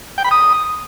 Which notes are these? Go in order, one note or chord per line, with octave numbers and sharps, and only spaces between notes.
G5
B5
D#6